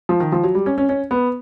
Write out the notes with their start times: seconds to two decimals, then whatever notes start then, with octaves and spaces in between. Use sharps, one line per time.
0.09 F3
0.20 D#3
0.32 F3
0.44 F#3
0.55 G3
0.66 C#4
0.78 C#4
0.89 C#4
1.11 B3